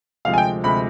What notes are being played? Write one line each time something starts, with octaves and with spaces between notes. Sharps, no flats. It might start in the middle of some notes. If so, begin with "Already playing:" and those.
D2 C3 F3 G#3 F5
G#5
G5
D2 C3 F3 G#3 B5